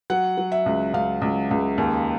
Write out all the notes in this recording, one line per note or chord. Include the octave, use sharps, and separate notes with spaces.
F#3 F#5
F#3
E5
C#2
C#2 F5
C#2
C#2
D#2